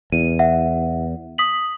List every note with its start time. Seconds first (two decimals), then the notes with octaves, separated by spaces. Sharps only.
0.12 E2 D#7
0.39 E5 F#5
1.38 D#6 B6 F#7